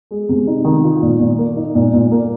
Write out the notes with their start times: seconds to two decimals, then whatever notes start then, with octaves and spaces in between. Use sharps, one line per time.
0.11 G#3
0.29 C3
0.47 D#4
0.65 D#3
0.84 F4
1.02 A#2
1.19 A#2
1.38 A#3
1.57 D#4
1.75 A#2
1.93 A#2
2.11 A#3